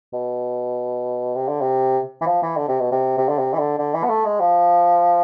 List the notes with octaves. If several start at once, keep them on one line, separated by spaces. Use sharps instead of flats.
B2
C3
D3
C3
E3
F3
E3
D3
C3
B2
C3
C3
D3
C3
E3
D3
D3
E3
B3
A3
G#3
F3